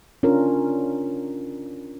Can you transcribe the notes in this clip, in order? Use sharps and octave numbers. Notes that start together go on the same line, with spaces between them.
C#4 D4 F4 A#4